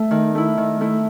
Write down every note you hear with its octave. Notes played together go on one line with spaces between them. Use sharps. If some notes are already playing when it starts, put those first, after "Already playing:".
Already playing: A3
D#3
A3 E4
D#3
A3 E4